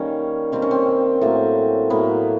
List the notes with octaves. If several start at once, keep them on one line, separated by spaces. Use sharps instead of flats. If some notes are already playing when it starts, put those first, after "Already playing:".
Already playing: D#3 G3 A#3 C#4
D#3 G3 A#3 C4
C#4
C4
A2 F#3 A#3
A2 F#3 A#3 B3